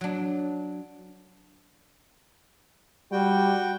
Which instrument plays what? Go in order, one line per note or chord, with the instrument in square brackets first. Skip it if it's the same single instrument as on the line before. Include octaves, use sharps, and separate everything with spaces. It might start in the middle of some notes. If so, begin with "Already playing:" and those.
[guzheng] F#3 D4
[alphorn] G3 [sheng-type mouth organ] F#4 G5